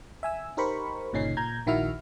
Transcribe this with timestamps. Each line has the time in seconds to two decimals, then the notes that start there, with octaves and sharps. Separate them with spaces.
0.23 E5 G#5 E6
0.57 D#4 G4 A#4 C5 B5 C#6
1.13 G1 A#2 C#3 C#4 D#4 C7
1.37 A#2 A#5 G6 G#6
1.66 A#1 D#3 E4 F#4 E5 F6